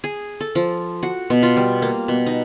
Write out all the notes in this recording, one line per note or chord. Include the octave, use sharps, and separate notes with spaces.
G#4
A4
F3
F#4
B2
F4
G3
A#3
B2
D#4